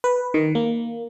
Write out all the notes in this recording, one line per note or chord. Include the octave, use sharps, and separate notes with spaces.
B4
D#3
A#3